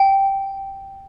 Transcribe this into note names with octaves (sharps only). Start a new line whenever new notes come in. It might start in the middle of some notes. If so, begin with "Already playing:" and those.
Already playing: G5